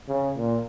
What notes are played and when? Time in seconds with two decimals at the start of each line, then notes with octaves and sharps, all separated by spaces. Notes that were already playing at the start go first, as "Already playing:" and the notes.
0.08 C#3
0.37 A#2